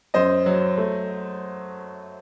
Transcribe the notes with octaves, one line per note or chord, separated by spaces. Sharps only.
F#2 C5 D#5
F#3
A3